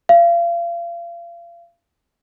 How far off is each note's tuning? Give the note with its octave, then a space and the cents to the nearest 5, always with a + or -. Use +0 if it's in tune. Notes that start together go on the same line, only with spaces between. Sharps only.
F5 -35